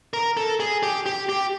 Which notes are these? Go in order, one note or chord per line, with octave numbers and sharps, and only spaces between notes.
A#4
A4
G#4
G4
G4
G4